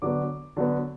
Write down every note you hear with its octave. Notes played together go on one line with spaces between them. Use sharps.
D3 F#3 B3 D6
D3 F#3 B3